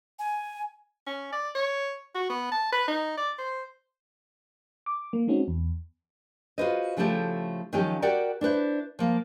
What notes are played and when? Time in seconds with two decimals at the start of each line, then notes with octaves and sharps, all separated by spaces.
0.19 G#5
1.06 C#4
1.32 D5
1.55 C#5
2.15 F#4
2.29 B3
2.51 A5
2.72 B4
2.88 D#4
3.17 D5
3.38 C5
4.86 D6
5.13 A#3
5.27 G#3 C4 C#4 D#4 F#4
5.48 E2
6.58 F4 F#4 A4 B4 C5 D#5
6.97 C#3 F3 A3 E4 G4 A4
7.73 D#3 F3 F#3 C#4 F4 G4
8.02 F#4 G4 A#4 D5 F#5 G5
8.41 D4 E4 B4 C5
8.99 F3 A#3